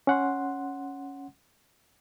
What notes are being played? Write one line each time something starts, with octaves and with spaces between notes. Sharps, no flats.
C#4 F#5 C6